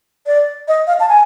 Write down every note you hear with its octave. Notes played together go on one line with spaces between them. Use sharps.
D5
D#5
F5
A5
G#5